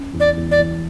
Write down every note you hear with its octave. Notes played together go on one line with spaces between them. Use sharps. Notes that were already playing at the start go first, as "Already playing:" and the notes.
Already playing: C#4
E2
D5
E2
D5
E2